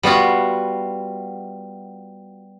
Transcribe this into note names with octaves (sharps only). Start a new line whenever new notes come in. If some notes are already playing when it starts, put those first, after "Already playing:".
G3 B3 F4 F#4